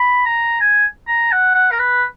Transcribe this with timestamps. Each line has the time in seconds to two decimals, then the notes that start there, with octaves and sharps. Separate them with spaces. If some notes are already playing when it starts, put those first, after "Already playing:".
Already playing: B5
0.26 A#5
0.61 G#5
1.08 A#5
1.32 F#5
1.55 F#5
1.72 A#4
1.79 B4